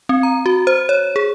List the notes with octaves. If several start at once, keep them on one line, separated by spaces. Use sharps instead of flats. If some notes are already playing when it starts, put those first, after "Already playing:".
C4
A#5
F#4
C5
C#5
G#4